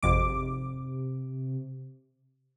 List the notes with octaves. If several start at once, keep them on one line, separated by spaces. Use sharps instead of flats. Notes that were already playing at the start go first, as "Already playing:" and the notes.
G#1 F2 C3 D6